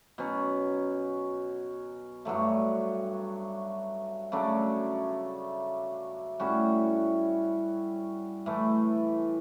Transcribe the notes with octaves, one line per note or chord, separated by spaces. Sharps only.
B2 F#3 C#4
G2 F#3 A3
C#3 F#3 A3 D4
A2 G3 C#4 F#4
A2 E3 A3